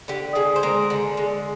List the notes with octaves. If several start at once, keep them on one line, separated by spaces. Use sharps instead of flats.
D3 G4
G#3 G#4
C5
G#3 A#4
D3
G#3